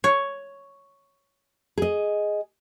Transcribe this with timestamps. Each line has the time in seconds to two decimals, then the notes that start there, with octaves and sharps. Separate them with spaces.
0.04 C#5
1.78 G#4 D#5